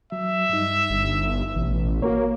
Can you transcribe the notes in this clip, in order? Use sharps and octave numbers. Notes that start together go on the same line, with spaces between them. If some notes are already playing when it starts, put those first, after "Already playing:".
F#3 E5
G2 G3 D#4
G1
A1 B2
A#3 F#4 A#4 C#5